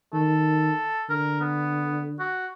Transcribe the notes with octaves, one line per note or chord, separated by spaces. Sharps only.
D#3 A4
D3 A#4
B3
F#4